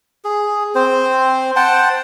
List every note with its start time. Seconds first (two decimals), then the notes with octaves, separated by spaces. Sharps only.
0.25 G#4
0.75 C4 C5
1.56 C5 F#5 G5 A5